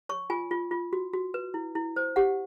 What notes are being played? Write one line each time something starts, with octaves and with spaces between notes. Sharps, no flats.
C#5 C#6
F4 G#5
F4
F4
F#4
F#4
B4
E4
E4
C5
G4 F#5